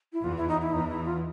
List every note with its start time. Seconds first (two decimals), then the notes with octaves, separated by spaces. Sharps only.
0.13 E4
0.24 E2 E3 F4
0.37 E4
0.48 D#4
0.61 E4
0.73 E2 E3 D#4
0.89 E4
1.05 F4